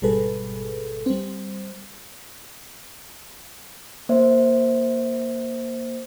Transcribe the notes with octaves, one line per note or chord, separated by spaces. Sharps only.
G#1 B2 G3 G#4 A4 B4
G3 C4
A#3 C5 E5